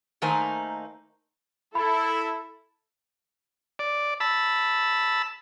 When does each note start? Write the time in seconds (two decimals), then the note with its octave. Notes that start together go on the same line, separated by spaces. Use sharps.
0.22 D#3 A3 A#3 D#4 C5 G#5
1.75 E4 A4 B5
3.79 D5
4.20 A5 B5 E6